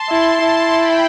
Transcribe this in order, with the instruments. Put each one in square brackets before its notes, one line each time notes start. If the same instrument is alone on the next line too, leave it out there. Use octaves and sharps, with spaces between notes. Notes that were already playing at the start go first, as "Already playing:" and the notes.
Already playing: [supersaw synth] A5 C6
[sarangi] E4
E4
[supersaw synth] G5 B5